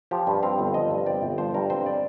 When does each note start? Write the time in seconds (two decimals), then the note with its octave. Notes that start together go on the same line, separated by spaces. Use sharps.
0.11 F3 G4
0.27 G2
0.43 C4 F5
0.59 G1
0.74 F3 D#5
0.91 G2
1.06 C4 D5
1.22 G1
1.38 F3 C5
1.54 G2 A#4
1.70 C4 C5
1.86 D5